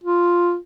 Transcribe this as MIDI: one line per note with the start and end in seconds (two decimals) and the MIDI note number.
0.04 0.56 65